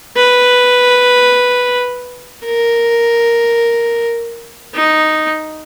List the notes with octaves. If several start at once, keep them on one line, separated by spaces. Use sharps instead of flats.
B4
A#4
D#4